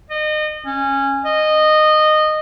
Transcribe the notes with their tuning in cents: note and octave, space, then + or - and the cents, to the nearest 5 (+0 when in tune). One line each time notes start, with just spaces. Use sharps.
D#5 -30
C#4 -15
D#5 -15